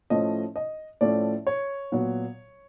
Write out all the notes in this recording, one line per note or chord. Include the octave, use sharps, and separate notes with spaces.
A2 F3 A3 C#4 D#5
D#5
A2 F3 A3 C#4 D5
C#5
A#2 F#3 B3